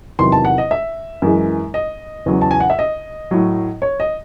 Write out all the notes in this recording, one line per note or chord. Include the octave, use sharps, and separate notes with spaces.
E2 C3 D#3 F#3 C6
A5
F#5
D#5
E5
F#2 E3 G#3
D#5
E2 C#3 F#3
A5
G#5
F#5
E5
D#5
A2 F#3
C#5
D#5